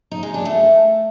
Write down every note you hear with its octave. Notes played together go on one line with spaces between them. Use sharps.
D#4
G#3
D4
A3